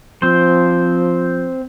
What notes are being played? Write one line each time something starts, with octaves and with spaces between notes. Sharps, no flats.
F3 C4 C5